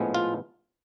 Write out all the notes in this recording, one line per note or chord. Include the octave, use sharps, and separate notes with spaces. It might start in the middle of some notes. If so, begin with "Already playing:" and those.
Already playing: A#1 A2 F3 G#3 B3
F4